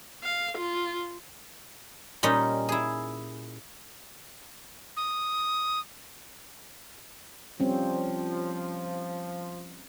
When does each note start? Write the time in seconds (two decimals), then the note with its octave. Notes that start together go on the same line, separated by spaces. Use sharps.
0.23 F5
0.57 F4
2.23 A#2 G3 C#4 D#4
2.69 E4 G#4
4.97 D#6
7.60 F3 G3 C4 C#4